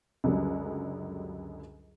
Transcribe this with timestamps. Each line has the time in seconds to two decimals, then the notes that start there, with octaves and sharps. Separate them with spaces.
0.24 C#2 F#2 D3 F#3 G3